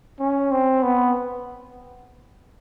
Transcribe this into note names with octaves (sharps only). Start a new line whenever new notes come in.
C#4
C4
B3